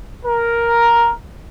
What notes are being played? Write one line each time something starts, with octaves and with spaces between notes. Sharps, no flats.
A#4